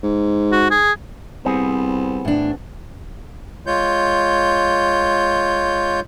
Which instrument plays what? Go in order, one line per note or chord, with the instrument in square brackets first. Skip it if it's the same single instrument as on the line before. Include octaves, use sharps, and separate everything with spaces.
[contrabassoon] G#2
[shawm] F#4
G#4
[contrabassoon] C2 [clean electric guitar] B3 C4 G#4
[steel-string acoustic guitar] A2 D4
[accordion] G#3 F4 C#5 G6